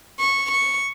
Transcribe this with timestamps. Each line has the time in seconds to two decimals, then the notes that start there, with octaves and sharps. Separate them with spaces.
0.20 C#6
0.51 C#6